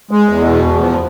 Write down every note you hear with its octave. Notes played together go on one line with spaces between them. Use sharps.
G#3
E2
B2
E2
F3